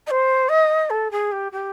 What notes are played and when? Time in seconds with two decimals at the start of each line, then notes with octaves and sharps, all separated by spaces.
0.06 D#5
0.10 C5
0.48 D#5
0.90 A4
1.11 G#4
1.32 G4
1.52 G4